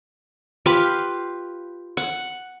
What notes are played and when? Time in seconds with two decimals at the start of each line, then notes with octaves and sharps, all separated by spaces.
0.66 F4 G4 B4 F5
1.97 F#5